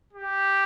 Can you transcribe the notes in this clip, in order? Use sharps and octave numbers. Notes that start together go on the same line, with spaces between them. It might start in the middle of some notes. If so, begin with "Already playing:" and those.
G4